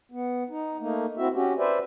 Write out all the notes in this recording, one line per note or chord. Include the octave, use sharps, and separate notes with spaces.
B3
D#4
A3 A#3 D#4
C4 E4 F#4 E5
C#4 F#4 G4
B4 C5 D5 E5